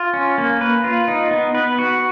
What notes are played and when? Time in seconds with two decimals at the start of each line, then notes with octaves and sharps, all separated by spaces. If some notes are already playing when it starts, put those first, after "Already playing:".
Already playing: F4
0.14 C#4
0.38 A#3
0.61 B4
0.84 F4
1.08 D#4
1.31 B3
1.55 B4
1.79 F#4